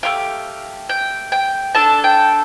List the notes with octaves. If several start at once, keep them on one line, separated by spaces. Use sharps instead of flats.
A3 C4 G4 F5
G5
G5
D4 A4 A5
G5